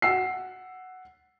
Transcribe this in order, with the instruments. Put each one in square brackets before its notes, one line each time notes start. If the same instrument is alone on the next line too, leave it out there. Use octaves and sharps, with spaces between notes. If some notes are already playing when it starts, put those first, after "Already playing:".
[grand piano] F#5 E6 C7